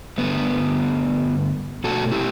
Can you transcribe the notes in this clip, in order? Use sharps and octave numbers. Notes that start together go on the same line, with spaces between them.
G2 D3 A3 B3
B2 A3 F#4 A4
E4 G4